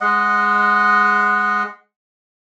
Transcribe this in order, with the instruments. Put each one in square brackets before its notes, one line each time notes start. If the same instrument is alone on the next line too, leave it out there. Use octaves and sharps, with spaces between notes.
[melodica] G#3 D#5 F#5